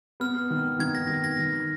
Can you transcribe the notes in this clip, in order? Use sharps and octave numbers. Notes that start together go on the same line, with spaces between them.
B3 F6
D#3
D#3 G#6
A#6
D#3
A#6
D#3